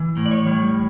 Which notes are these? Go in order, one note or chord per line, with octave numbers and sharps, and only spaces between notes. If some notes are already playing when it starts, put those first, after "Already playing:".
Already playing: E3
A2
D5
C#5
G3